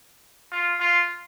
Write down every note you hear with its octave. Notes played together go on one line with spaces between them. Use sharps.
F4
F4